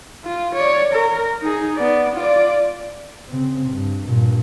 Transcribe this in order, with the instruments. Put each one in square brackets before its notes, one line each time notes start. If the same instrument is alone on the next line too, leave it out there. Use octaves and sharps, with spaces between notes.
[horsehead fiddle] F4
C#5 D5
A#4
D#4 G#4
B3 D5
F4 D5
[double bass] C#3 C4
G2
G2 A#2